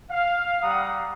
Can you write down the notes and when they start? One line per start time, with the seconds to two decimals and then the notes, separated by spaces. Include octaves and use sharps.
0.10 F5
0.62 G3 F#5 A#5 D#6